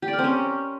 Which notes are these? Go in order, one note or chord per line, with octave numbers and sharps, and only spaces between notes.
G4
D5
A#4
C4
C#4